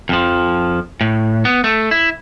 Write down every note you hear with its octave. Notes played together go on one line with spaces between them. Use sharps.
F2 F3
A2
B3
A3
E4